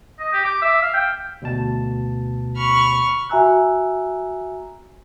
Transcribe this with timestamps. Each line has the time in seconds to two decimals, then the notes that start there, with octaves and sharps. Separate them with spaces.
0.19 D#5
0.32 G4
0.44 D6
0.62 E5
0.82 F5
0.93 G5
1.42 D2 B2 A5
2.56 B5 C#6 F6
3.29 F#4 E5 G#5 A#5 E6 F#6